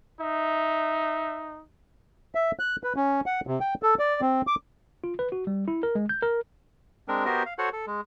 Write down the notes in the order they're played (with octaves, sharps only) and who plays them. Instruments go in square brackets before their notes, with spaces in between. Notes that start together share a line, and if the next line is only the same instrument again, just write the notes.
[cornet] D#4 [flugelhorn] E5
[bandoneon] E5
F#6
B4
C#4
F#5
C3
G5
A4
D5
C4
D6
[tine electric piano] F4
B4
F#4
G3
E4
A#4
G#3
G6
A#4
[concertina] G#3 C4 D4 A#4
B3 F#4 G4 A#4 C5 D#5
F5
F#4 A4 C5 C#5 F#5
A4
G#3